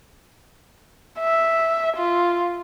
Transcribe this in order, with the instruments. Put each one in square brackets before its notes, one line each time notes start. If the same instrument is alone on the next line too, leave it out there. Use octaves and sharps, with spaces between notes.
[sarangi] E5
F4